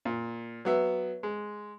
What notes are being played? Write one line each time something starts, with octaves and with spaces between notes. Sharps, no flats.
A#2
F#3 B3 E5
G#3